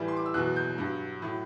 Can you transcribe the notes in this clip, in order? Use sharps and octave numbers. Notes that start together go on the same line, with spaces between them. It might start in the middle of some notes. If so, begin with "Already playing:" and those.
Already playing: A2 E3 G3
C6
D6
E6
E2 B2 F#3 F#6
G6
G2 F#3
A2 F#3